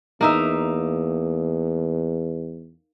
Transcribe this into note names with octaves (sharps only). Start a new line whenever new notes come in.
E2 A#3 D#4 E5